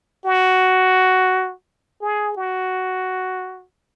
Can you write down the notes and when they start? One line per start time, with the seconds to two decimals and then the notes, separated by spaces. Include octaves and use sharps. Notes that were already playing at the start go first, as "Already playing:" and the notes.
0.26 F#4
2.02 G#4
2.37 F#4